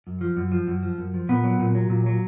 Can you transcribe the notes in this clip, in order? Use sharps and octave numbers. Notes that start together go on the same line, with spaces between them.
F#2
F3
F#2
F3
F#2
F3
F#2
F3
A#2 B3
F#3
A#2
F#3
A#2
F#3